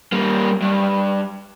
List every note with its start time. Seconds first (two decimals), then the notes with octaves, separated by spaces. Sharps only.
0.12 G3 A#3
0.62 G2